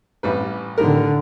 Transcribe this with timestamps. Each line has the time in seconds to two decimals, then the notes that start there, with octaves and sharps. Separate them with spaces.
0.23 A1 G3 B4
0.78 A2 D3 D#3 G4 A#4